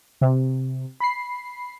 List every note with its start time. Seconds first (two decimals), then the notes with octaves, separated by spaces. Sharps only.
0.21 C3
1.00 B5 C7